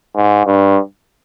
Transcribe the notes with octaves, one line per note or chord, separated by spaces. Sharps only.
G#2
G2